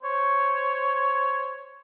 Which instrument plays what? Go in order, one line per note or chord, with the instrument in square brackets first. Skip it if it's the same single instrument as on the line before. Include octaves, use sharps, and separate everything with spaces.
[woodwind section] C5 C#5